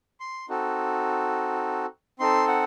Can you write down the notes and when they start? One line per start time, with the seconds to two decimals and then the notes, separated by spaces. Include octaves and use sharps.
0.20 C6
0.49 C4 D#4 F#4 A4
2.19 C4 D#4 A4 C6
2.48 F#5